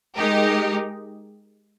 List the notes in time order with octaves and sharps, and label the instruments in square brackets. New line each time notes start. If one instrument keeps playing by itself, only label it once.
[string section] G#3 D#4 G4 A#4